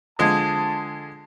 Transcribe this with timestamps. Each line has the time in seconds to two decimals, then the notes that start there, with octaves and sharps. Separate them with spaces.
0.19 D3 F3 G#3 A5 D#6 G#6